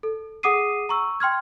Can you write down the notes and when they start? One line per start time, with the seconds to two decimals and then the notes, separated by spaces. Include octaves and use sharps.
0.03 A4
0.43 G#4 F#5 D6 D#6 C7 D#7
0.89 A#5 C#6 E6
1.20 G5 C6 F6 G#6